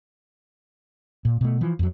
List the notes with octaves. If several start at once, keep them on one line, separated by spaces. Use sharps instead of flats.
A#2
B2 A3
E3 F3
F2 F#3